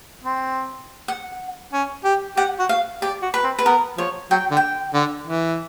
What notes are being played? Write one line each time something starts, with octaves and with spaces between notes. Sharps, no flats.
C4
F#5
C#4
G4
G4 F#5
F#4
F5
G4 D5
F#4
B4
C4
B4
B3 A#4
F3 C#5
F#3 G5
D3
G5
D3
E3